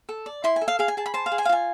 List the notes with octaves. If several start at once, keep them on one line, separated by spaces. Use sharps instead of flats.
A4
D5
E4 C6
G#5
A4
F5
G#4 F5
G#5
G#4 A5
B5
C5 A5
F5
G#4
G#5
F5
F4 G#5